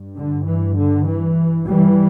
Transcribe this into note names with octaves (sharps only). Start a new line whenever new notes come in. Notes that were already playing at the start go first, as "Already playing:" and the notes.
Already playing: G2
D3
E3
D3
E3
E3 G3